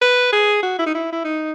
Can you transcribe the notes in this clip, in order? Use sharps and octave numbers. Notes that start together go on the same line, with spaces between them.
B4
G#4
F#4
E4
D#4
E4
E4
D#4